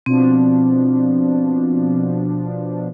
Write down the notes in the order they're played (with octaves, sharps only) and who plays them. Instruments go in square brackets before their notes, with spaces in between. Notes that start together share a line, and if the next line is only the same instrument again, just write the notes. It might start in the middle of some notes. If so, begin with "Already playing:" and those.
[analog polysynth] B2 F3 D4 [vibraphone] C4